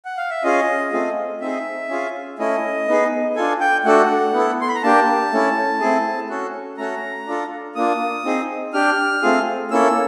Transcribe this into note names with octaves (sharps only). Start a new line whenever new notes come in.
F#5
F5
E5
C#4 F4 G#4 D#5
A3 C4 F4 G#4
C4 D#4 G#4 E5
C#4 F4 G#4
A3 C#4 E4 D#5
B3 D#4 G#4
D4 F4 A4 G#5
G5
A3 D4 F#4 A4 F#5
B3 E4 A4
C6
B5
A#5
A#3 D4 G4 A5
A3 C#4 E4
A3 C4 E4 G#4
C#4 F#4 A4
A3 C#4 F#4 A4 A#5
D4 F4 A4
A#3 D4 F4 D#6
C4 D#4 G#4
D4 G4 F6
A3 C4 F4 G#4
A#3 C#4 E4 A4 E6